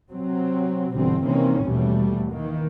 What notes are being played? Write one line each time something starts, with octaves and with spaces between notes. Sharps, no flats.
C3 F#3 C4
G1 B2 D3 E3 G3 C4
C3 D#3 E3 A#3 C4 C#4
D#2 B2 E3 G3 A3
D#3 E3 A#3